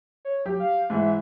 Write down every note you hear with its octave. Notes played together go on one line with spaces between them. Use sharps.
C#5
F#3 G4
F5
G#2 E3 E5